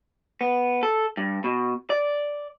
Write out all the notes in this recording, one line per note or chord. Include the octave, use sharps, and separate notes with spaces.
B3
A4
G2
B2
D5